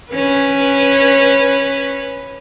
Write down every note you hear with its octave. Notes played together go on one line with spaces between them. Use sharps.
C#4 B4